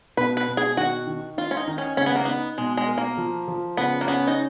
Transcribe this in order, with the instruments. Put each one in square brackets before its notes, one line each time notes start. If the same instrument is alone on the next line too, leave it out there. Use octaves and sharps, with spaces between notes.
[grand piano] B2 [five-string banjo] B4
[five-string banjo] B4
[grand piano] B2
[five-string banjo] G#4
[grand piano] D#3 [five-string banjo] F#4
[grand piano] D#3
[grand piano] D#3 [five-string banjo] F4
[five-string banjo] C#4
D#4
[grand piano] D#3
[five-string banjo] C#4
[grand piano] C#3 [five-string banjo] C#4
[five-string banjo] B3
A#3
[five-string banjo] B3 [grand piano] D#4
[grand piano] B2 [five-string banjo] G#3
[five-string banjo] G#3
[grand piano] A#4
[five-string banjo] A#3
[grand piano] F3
F3
[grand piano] C#3 [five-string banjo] B3
[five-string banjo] A#3
[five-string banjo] B3 [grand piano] C#4
[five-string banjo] D#4